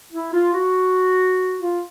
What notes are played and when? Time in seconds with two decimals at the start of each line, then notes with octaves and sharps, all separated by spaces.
0.13 E4
0.33 F4
0.54 F#4
1.58 F4